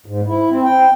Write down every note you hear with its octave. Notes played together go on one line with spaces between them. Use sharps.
G#2
E4
C4
G5